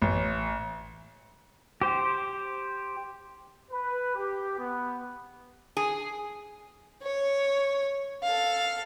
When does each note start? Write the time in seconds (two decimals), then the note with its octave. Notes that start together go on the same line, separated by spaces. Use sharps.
0.02 A1
1.81 G4 C5
3.71 B4
4.15 G4
4.58 B3
5.77 G#4
7.02 C#5
8.23 A4 F5